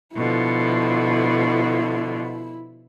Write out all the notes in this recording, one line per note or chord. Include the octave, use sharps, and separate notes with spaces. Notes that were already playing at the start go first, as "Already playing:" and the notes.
B2 D3 F3 E4